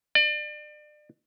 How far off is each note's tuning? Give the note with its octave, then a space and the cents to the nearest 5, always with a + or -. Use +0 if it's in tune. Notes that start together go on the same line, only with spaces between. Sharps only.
D5 +35